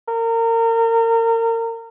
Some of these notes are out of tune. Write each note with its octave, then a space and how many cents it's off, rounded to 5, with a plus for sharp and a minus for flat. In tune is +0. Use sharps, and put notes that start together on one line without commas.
A#4 -30